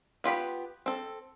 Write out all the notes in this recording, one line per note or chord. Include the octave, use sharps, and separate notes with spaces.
B3 F4 G4 B5
C4 A4